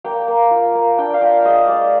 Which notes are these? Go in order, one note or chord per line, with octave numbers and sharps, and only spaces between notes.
A#3 G5
A#3
F4
A#3
D4 G5
F5
F4 G5
G#3 D#5
G#3 D5